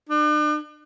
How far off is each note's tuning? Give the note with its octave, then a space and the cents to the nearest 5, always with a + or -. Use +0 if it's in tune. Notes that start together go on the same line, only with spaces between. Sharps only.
D4 +40